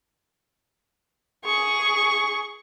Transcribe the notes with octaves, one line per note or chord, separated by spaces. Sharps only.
G#4 C#6